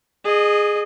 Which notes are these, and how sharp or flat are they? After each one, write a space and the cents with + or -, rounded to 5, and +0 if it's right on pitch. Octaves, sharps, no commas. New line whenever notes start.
G#4 +0 D#5 -30